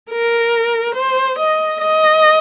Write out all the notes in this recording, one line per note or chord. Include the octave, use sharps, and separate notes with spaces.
A#4
C5
D#5
D#5